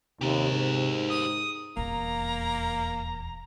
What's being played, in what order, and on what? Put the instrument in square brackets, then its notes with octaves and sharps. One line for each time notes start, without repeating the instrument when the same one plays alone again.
[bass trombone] D#2 [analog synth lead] C3 [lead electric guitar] G4 A#4
[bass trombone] G#2
[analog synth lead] D#6
[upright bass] D#1 E2 [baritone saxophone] A#3 [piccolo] A#5